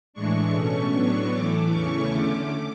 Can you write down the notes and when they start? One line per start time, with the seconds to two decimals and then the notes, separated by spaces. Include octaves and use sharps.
0.14 A2 E3 G#3 D4 C#6
0.53 B2 A3 C#4
0.92 A2 F#3 B3 D4
1.32 A2 E3 A3 D6
1.71 E2 C#3 E3 A3 C#4 C#6
2.10 D3 A3 C#4 D6